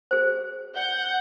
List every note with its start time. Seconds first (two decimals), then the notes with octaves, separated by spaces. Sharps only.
0.11 G#4 C5
0.76 F#5 G6